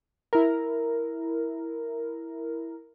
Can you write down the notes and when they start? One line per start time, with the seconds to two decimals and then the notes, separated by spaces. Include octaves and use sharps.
0.33 E4 A#4